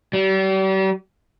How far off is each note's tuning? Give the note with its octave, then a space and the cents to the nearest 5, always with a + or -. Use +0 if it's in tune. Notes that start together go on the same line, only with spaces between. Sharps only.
G3 -40